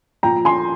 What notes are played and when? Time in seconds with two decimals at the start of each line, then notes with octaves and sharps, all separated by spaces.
0.23 A#2 F3 G5 A#5
0.45 G#5 C6